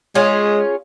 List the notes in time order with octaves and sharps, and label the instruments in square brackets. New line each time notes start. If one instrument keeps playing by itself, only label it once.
[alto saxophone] G#3 [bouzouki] C#4 F4 G#4